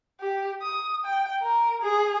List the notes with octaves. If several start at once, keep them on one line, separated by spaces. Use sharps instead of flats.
G4
D#6
G5
A#4
G#4